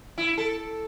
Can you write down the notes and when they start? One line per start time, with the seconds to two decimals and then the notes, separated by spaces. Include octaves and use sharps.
0.18 E4
0.38 A4